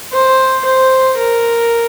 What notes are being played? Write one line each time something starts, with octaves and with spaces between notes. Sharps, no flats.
C5
C5
A#4